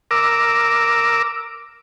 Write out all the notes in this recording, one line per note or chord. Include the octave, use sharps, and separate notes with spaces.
A#4 D6 E6